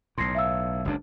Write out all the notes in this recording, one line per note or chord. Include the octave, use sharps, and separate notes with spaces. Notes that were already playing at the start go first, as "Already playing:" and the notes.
B1 A2 C6 A#6 C7
E5 F5 E6
F#1 C#2 D4